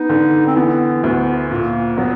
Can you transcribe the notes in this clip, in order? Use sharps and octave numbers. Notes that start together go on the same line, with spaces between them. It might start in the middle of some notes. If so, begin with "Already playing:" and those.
Already playing: B3 D#4
D3
C4
E3 B3
D2 B3
A#2 A#3
F#3 B3